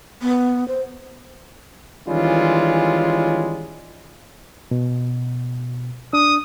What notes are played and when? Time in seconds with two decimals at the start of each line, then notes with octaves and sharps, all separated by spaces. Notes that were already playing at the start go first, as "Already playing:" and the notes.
0.22 B3
0.68 C5
2.08 D#3 E3 G3 G#3 C#4 F4
4.71 B2
6.13 D4 D#6